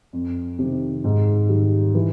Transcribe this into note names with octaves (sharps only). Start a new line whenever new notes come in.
F2
C3 D#3
G#2
D#3 G3
E3